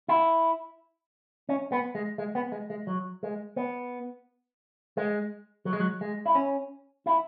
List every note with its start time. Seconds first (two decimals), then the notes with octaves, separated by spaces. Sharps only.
0.08 E4
1.49 C#4
1.72 B3
1.95 G#3
2.18 G#3
2.35 B3
2.52 G#3
2.70 G#3
2.87 F#3
3.23 G#3
3.56 B3
4.97 G#3
5.65 F#3
5.73 G#3
5.80 F#3
6.01 G#3
6.26 E4
6.35 C#4
7.06 E4